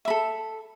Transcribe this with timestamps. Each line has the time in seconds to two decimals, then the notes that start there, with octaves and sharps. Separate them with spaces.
0.05 E5
0.08 B5
0.10 A4